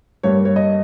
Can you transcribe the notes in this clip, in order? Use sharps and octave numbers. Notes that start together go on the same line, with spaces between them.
G2 G3 A#3 C#5
C#5
D#5